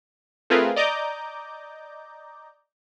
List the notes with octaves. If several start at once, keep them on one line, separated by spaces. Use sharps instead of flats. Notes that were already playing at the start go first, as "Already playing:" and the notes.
A3 C4 F4 G#4 A#4 B4
D5 D#5 A#5 D6 G6